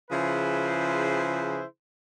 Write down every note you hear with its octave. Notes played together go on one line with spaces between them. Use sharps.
C#3 F3 E4 G#4 B4 C5